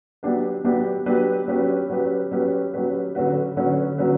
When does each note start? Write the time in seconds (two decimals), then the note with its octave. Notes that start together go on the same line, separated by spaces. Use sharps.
0.23 F#3 B3 D4 G4 B4
0.64 F#3 B3 D4 G4 B4
1.06 F#3 B3 D4 G4 B4
1.48 F#3 C#4 G4 B4
1.90 F#3 C#4 G4 B4
2.32 F#3 C#4 G4 B4
2.74 F#3 C#4 G4 B4
3.15 D3 F#3 C#4 F#4 B4
3.57 D3 F#3 C#4 F#4 B4
3.98 D3 F#3 C#4 F#4 B4